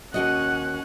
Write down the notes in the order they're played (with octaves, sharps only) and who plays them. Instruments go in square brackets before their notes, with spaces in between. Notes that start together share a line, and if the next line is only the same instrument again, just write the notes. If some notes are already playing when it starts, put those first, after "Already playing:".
[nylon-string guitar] D#2 F#4 D#5 [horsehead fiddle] C#4 F#5